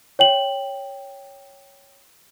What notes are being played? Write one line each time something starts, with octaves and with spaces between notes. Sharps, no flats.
C#5 G5 F#7